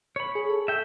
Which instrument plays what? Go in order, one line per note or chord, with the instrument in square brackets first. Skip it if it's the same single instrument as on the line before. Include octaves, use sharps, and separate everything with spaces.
[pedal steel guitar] C#5 B5
[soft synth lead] G#4
A4
[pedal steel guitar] E5 G5